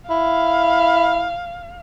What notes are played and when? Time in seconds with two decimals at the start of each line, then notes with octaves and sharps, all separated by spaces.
0.10 E4 F5